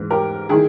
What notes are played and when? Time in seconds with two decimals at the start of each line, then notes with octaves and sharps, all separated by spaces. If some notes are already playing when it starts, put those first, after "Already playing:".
Already playing: G#2 E3
0.10 G4 A#4
0.49 D#3 E4 G#4